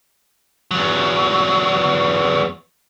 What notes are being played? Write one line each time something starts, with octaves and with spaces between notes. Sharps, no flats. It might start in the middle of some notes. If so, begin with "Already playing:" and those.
E2 F#3